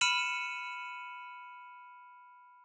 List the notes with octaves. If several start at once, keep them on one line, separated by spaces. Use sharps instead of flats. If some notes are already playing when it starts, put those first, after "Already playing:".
B5 F6 C#7 D#7 E7 F#7